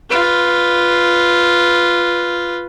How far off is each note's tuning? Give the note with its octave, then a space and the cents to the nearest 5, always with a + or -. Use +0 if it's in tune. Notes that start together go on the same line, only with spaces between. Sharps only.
F4 +0 B4 +0